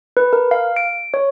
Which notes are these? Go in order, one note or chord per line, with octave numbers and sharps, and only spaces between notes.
B4
A#4
F5
D7
C#5